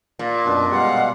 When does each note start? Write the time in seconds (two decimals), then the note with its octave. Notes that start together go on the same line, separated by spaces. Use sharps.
0.19 A#2
0.46 F#2 B2 D4
0.70 B2 G3 G#3 F5 F#5